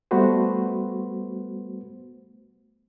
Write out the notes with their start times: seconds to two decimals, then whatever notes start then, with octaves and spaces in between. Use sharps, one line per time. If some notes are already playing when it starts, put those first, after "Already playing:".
0.11 G3 A3 B3 F#4 B4 C5